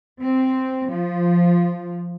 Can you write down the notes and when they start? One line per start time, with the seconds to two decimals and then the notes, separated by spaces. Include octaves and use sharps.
0.22 C4
0.91 F3